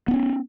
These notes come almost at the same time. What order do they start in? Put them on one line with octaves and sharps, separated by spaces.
B3 D4 C#4